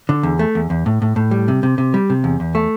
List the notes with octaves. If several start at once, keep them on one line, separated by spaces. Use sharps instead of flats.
D3
E2
A3
E2
E2
A2
A2
A2
G3
C3
C3
C3
G3
C3
E2
E2
A3